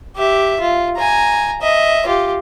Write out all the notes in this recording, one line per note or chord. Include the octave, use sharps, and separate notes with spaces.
G4 E5
F4
G#5 A#5
D#5 E5
F4 G4